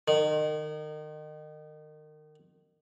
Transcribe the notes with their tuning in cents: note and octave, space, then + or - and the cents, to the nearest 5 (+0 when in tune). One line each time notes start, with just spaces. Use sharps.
D#3 -30